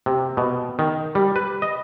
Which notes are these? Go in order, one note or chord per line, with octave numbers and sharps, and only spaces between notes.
C3
B2
D#3
G3
B4
D#5